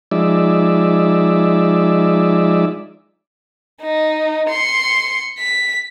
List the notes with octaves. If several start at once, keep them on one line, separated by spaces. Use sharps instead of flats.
F3 G#3 D#4 D5 E5
D#4
C6 C#7
B6